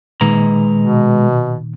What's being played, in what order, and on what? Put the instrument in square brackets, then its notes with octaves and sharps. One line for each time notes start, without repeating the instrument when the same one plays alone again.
[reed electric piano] A#2 D#3 [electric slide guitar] G#3 B4 A#5
[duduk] B2